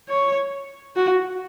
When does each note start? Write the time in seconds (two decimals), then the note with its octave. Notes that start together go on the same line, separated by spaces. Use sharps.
0.09 C#5
0.96 F#4